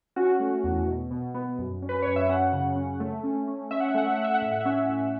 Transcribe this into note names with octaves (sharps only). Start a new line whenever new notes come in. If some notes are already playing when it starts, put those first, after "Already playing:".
C#4 F#4
A3
E2
B2
B2
B3
F#2
C#4
B4
F#2 C#5
E5
C#4 F#5
C#3
C#4
A3
C#4
C#4
C#4 E5
F#5
E5
A3 F#5
E5
A3 F#5
E5
F#5
A2 E5
F#5
C#4 E5
A2